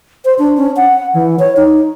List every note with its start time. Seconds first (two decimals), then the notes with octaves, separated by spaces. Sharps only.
0.25 C5
0.39 D4
0.57 C#4
0.77 F#5
1.14 E3
1.39 C#5
1.57 D#4